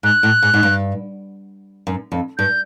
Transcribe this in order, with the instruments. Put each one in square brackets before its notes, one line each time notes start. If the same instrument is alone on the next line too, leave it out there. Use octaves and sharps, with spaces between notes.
[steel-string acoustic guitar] G#2 [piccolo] F#6
[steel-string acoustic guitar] A2
G#2
G#2
G2
F#2
F2
[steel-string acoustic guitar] G2 [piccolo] G6